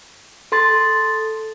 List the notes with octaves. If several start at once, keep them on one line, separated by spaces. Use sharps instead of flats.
A4 C6 A6